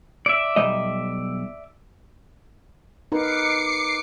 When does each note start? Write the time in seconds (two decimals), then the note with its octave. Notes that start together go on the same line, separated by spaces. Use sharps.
0.26 D5 E5
0.56 B1 G3 D#5
3.12 D#4 A#4 B4 D6 C7 C#7